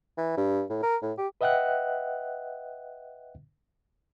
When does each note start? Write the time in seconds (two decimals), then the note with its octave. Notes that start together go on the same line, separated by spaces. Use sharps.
0.17 E3
0.37 G2
0.70 A2
0.83 A#4
1.02 A2
1.18 G4
1.41 B4 D#5 E5 F#5 G5 F#6